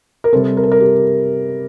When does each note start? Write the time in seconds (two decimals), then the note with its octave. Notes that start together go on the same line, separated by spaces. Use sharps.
0.24 A#4
0.33 C3 G3 C4 A4
0.57 A#4
0.63 A4
0.72 A#4
0.80 G4